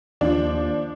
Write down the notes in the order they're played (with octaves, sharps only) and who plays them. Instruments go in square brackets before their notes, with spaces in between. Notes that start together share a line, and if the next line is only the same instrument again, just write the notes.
[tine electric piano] D#2 [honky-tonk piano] F3 D4